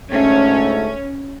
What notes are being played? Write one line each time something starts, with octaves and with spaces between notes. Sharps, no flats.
D2 G#2 A3 C#4